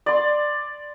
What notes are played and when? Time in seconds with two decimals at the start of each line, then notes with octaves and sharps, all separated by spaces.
0.06 D5 C6